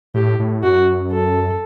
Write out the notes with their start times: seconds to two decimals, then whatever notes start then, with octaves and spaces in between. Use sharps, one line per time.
0.14 A2 G4
0.39 A2
0.63 F#2 F#4
1.11 A4